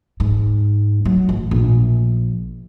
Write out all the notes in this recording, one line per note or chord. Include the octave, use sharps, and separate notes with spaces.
G#2
F#3
A1
A#1